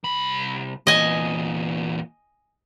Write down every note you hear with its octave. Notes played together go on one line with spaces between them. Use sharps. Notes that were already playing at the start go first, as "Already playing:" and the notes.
C2 B5
E2 A#2 D#5 G#5